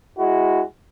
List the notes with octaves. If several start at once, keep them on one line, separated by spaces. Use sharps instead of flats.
G#3 E4 F#4